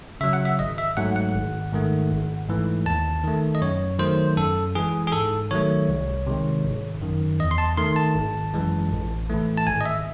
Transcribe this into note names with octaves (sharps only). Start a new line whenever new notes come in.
C#3 F#3 E5
F#5
E5
G#1 D#5
E5
G#2 F#3 A3 F#5
F#5
G#1
G#2 D#3 A3
G#1
G#2 E3 A3
D#2 A5
D#3 A3
D#5
F#2 C#5
D#3 F#3 A3 C5
F#2 A4
E3 G#3 G#4
G#4
G#2 A4
D#3 F#3 A3 C#5
C2
C3 D#3 G#3
G#1
F#2 D#3
E2 D#5
C6
A5
D#3 A3 C6
A5
G#1
F#2 E3 G#3
A1
A2 E3 A3
A5
G#1 G#5
D#5
E5